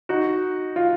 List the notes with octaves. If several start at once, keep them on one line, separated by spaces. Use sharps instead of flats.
D#4 F#4
F4